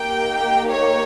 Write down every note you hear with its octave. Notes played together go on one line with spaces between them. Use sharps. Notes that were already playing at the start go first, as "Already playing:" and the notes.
Already playing: A#3 D#4 G4 G5
C#5